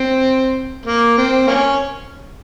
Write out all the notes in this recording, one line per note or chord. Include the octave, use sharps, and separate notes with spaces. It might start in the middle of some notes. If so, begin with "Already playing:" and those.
Already playing: C4
A#3
C4
A#3 C#4